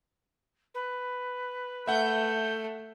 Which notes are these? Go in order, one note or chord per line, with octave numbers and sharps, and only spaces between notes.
B4
A3 E5 F#5 G6